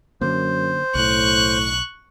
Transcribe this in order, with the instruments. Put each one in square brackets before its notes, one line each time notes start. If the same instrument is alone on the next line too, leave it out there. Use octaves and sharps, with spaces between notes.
[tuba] F#2 [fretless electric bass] D3 A#3 [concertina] C5
[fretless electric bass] B1 [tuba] A2 [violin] C#6 F#6